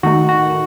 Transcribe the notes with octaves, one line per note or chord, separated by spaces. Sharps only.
D#3 A3 D#4 F#4
F#4